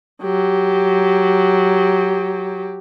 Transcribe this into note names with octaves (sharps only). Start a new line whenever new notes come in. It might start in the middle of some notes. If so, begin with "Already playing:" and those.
F#3 G4